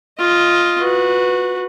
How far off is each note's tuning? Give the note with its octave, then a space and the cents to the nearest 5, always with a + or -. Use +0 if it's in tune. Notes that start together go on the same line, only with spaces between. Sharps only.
F4 +0 D#5 +15
F#4 -20 B4 +0